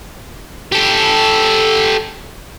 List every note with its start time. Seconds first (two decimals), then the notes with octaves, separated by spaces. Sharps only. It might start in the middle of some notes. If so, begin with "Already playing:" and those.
0.72 G4 A4